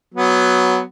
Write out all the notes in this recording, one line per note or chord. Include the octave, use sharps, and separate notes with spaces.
F#3 B3